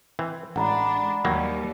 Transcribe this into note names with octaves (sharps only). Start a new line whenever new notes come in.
E3 C4
A1 G#3 D4 F#5 A#5 B5
D#2 D#3 F#3 G3 A#3